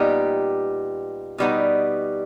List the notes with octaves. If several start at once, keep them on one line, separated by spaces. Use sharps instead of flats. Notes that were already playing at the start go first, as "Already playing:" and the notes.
Already playing: A#2 G3 B3 D#4 G4
B2 G3 B3 D#4